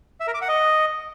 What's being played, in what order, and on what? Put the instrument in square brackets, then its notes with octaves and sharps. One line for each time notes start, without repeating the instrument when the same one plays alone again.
[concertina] E5
A#4
D6
F#5
D#5